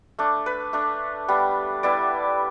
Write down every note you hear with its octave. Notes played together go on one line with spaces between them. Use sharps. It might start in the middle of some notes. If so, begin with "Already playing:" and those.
A3 D4
B4
A3 D4
G3 B3 D4
G3 B3 E4 D5